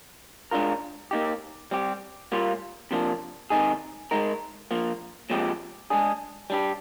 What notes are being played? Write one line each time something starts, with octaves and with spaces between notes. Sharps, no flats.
G#3 D4 F4 A#4
A#3 D#4 G4
G3 C4 G4
A#2 G3 A#3 F4
C3 F3 A#3 D4
C3 D#3 G#3 D#4 G#4
G#3 D#4 A#4
A#2 F3 A#3
A#2 F3 G#3 C4 G4
G#3 D4 G#4
G3 D4 G4